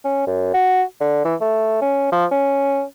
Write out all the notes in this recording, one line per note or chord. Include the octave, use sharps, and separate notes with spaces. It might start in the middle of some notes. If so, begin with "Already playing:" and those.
C#4
F#2
F#4
D3
E3
A3
C#4
F3
C#4